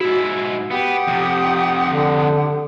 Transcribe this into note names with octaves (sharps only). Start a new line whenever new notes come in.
G#2 E4 F#4
B3 G4 F#5 D#6
F2 C3
D3